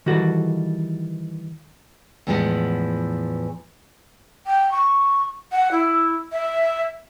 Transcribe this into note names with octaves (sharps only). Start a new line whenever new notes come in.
D#3 E3 G3 F#4 A4
E2 A2 E3 F3 G#3 F#5
G5
C#6
F#5
E4
E5